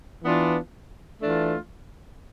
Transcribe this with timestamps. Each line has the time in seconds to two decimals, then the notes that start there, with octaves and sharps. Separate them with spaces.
0.24 E3 B3 D4 F4
1.22 E3 A3 D4 F4